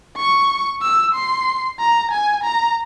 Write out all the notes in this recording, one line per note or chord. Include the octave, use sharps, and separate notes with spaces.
C#6
E6
C6
A#5
G#5
A#5